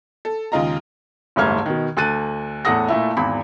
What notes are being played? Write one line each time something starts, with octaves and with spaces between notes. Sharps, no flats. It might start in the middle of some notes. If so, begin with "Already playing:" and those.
A4
D#2 C#3 G#3 F4 D#5 A#5
F#1 D#2 G#2 A3 F6 G#6
B2 D#3
D2 A4 F#6 A6 D#7
E2 A2 A4 F#5 D#6 A#6
A#2 A3 E4
G#1 E2 B5